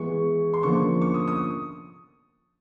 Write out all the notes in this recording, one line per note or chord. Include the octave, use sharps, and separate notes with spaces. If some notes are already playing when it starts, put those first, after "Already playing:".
Already playing: E3 G#3 B3 C#6
C6
D3 F3 A#3 C#4 C#6
C#6
D#6
D#6